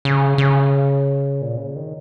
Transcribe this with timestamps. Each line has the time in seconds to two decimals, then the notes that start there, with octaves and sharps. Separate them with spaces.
0.05 C#3
0.38 C#3
1.42 A#2
1.57 C#3
1.76 D#3